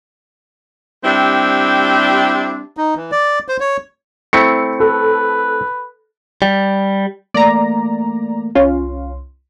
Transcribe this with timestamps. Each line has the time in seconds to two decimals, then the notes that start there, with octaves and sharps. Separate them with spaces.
1.05 G3 C4 D4 E4 G4
2.77 D#4
2.96 E3
3.12 D5
3.48 C5
3.60 C#5
4.33 A3 C4 E4 C#7
4.80 A4 B4
6.42 G3
7.34 E3 A3 A#3 D5 A#5
8.55 C2 C#4 F4 C6